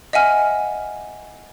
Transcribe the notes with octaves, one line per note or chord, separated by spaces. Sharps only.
D#5 E5 F#5 G#5 F6